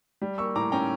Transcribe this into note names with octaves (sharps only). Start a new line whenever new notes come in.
G3
A#3 C#6 E6
A2 A#5 D6
C#4 G5 A#5